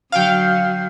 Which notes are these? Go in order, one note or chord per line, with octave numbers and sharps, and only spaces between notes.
D3 F#3 F5 G5